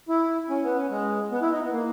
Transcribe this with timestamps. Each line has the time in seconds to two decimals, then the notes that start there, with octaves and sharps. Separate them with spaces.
0.09 E4
0.50 C#4
0.63 B3
0.77 C#4
0.90 G#3
1.32 B3
1.42 E4
1.52 D#4
1.63 B3
1.72 A#3